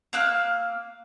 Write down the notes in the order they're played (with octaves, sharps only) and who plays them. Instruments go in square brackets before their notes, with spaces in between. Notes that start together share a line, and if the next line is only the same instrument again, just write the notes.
[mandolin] A#3 F5 E6 F#6